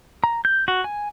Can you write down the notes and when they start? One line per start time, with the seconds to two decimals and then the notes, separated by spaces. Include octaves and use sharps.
0.24 A#5
0.45 G6
0.68 F#4
0.84 G#5